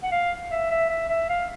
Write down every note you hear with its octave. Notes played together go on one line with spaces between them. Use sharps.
F#5
F5
E5
E5
E5
E5
F5